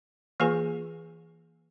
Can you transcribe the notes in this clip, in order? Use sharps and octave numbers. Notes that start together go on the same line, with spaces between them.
E3 A#3 F4 G#4 B4 G#5